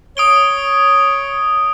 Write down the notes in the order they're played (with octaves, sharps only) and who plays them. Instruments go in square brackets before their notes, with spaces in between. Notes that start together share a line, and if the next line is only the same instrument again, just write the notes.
[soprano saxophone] C#5 [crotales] D#6 D7 G7